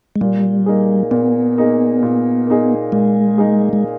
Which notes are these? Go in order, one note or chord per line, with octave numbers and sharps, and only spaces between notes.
G#3
A#2 G3
A#3 D#4 G#4
A#2 B3
A#3 D#4 G#4
A#2
A#3 D#4 G#4
A#2 G#3
A#3 D#4 G#4
G#3